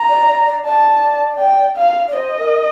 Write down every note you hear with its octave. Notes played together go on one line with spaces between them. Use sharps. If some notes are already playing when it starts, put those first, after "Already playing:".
Already playing: A#5
D5
D5
D5
D5 A5
G5
F5
D5
C5 D#5
A#4